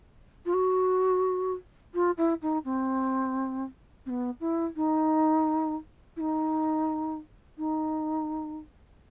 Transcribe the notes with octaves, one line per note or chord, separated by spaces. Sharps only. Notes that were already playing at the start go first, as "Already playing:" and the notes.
F4
F#4
F4
E4
D#4
C4
C4
B3
E4
D#4
E4
D#4
D#4